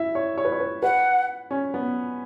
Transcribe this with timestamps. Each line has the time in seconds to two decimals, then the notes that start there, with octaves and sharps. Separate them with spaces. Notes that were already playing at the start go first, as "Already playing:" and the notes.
Already playing: E4 E5
0.15 C#5
0.38 C#5
0.45 B4
0.52 C#5
0.60 B4
0.83 B4 F#5
1.51 C#4
1.74 B3